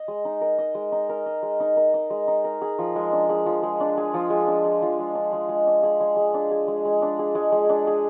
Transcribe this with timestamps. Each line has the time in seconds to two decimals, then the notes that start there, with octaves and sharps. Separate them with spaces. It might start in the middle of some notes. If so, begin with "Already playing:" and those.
Already playing: D#5
0.08 G#3
0.25 D#4
0.41 A#4
0.58 D#5
0.75 G#3
0.92 D#4
1.09 A#4
1.26 D#5
1.43 G#3
1.60 D#4
1.77 A#4
1.94 D#5
2.10 G#3
2.28 D#4
2.44 A#4
2.62 G#4
2.79 F3
2.96 G#3
3.12 D4
3.29 G#4
3.46 F3
3.63 G#3
3.80 D4
3.97 G#4
4.14 F3
4.30 G#3
4.47 D4
4.65 G#4
4.82 F3
4.99 G#3
5.15 D4
5.33 G#3
5.49 G#3
5.67 D4
5.83 G#4
6.00 G#3
6.16 G#3
6.34 D4
6.51 G#4
6.68 G#3
6.85 G#3
7.02 D4
7.19 G#4
7.35 G#3
7.52 G#3
7.69 D4
7.87 G#4